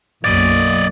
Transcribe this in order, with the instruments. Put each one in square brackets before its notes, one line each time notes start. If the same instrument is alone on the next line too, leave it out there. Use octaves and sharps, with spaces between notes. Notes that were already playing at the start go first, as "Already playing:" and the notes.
[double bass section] B1 F#2 A#3 [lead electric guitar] D5 D#5